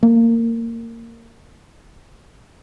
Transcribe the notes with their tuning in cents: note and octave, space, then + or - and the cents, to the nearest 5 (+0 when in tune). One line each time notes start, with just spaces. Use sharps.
A#3 -20